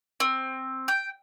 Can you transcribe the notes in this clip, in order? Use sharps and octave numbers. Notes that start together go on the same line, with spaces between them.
C4
G5